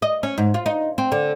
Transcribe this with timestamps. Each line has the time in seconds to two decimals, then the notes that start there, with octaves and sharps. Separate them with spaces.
0.02 D#5
0.23 C#4
0.38 G#2
0.54 F4
0.66 D#4
0.98 C4
1.12 D3